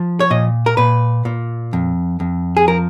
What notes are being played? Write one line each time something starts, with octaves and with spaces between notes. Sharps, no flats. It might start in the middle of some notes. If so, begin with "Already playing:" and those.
Already playing: F3
C#5
A#2 D#5
A#4
A#2 B4
A#2
F2
F2
G#4
F3 A#4